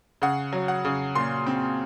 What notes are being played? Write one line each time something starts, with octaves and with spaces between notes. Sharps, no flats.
C#3 F#5
F#3
F#5
C#3
A#2 C6
C4